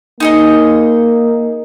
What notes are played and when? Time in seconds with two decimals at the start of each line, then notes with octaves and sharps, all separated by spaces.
0.20 A#3 D#4 G#4 D#5